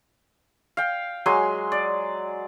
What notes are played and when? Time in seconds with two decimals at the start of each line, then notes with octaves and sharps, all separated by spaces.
0.77 F5 G5
1.26 F#3 G#3 G#5 C6
1.72 D5